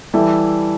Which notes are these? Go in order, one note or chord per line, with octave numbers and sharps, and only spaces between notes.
E3 G3 E4 A4